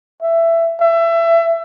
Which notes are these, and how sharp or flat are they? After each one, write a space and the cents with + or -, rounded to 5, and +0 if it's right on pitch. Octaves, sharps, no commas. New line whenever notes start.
E5 +15
E5 +25